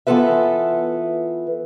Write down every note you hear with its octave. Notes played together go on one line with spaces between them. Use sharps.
E3 B3 F4 A4 B4 E5